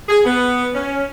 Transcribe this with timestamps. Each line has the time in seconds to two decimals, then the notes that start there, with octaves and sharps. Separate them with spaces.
0.09 G#4
0.24 B3
0.74 C#4